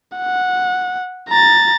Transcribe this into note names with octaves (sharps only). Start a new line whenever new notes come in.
F#5
A#5 A6